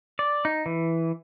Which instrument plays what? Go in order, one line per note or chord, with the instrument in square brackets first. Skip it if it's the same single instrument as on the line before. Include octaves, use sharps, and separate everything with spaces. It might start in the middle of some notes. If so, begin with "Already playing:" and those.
[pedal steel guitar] D5
D#4
E3